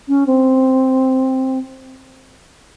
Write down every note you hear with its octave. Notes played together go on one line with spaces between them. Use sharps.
C#4
C4